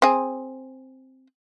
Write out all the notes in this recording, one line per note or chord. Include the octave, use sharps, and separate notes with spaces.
C4 G#4